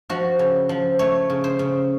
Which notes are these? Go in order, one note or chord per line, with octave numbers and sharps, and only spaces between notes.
F3 F#4
C#3
F3
A3 C#5
C#3
C5
C#3